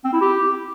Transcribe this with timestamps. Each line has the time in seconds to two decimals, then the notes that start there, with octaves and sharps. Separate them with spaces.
0.04 C4
0.13 E4
0.21 G4